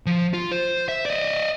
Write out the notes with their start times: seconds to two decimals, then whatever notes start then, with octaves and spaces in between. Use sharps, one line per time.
0.06 F3
0.34 F4
0.51 C5
0.88 E5
1.06 D5 D#5